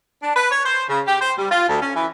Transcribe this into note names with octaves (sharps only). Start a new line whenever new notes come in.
D4
B4
C#5
C5
C#3
G4
C5
G3
F4
D2
C#4
E3